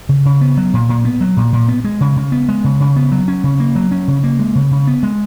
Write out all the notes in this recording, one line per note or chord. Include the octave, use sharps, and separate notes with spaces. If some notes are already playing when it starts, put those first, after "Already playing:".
C#3
C#3
B3
F#3
A#2
A#2
B3
F#3
A#2
A#2
B3
G#3
C#3
C#3
B3
G#3
C#3
C#3
B3
F#3
C#4
C#3
A#3
F#3
C#4
C#3
A#3
G#3
C#3
C#3
B3
G#3